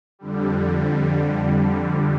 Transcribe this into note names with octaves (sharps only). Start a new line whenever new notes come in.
F2 D3 G3